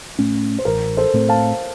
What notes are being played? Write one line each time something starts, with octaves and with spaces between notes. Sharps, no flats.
A2 A3 C#4
C5
A1 A#4
A4 C5
A2 A3 C4
F5 A5